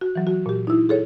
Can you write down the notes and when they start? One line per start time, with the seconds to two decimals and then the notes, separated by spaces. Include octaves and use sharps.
0.01 F#4
0.15 E3 F#3
0.27 F#4
0.46 A#2 G4
0.67 D#4 E4
0.89 G#4 A4 C#5